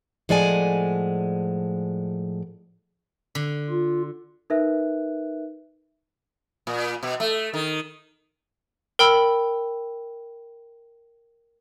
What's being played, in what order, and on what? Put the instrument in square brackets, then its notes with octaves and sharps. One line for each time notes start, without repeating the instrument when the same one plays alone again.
[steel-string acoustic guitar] A2 F3 G#3 D5 F#5 G#5
[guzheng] D3
[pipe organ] F4
[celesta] D#4 A#4 B4 E5 F#6
[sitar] A#2
B2
A3
D#3
[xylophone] A#4 G5 B5 E6